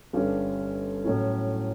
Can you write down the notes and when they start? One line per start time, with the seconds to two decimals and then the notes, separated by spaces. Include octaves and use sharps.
0.13 G1 G2 D3 G3 C#4
1.04 A2 F#3 C#4 E4